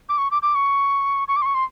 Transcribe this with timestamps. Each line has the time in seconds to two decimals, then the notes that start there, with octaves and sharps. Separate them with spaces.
0.09 D6
0.18 C#6
0.31 D6
0.42 D6
0.55 C#6
1.28 C#6
1.36 D6
1.42 C6
1.46 C#6
1.55 C6